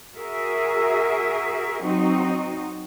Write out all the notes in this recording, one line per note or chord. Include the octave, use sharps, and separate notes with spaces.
F#4 G#4 A#4 E5
F#3 C4 D#4 F#4